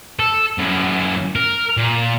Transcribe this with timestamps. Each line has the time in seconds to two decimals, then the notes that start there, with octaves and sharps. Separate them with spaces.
0.20 A4
0.58 F#2 E4
1.36 A#4
1.77 A#2